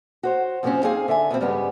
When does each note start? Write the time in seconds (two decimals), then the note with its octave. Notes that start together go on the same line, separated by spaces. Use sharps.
0.23 F#4 C5 C#5
0.63 F#2 C3 F3 A3 C4 C#4
0.83 A#3 C4 D#4 G#4 F5 G#5
1.08 D3 E5 G5 G#5
1.29 E2 B2 D3 F3 C4
1.41 G2 C#3 G3 G#3 B3 G4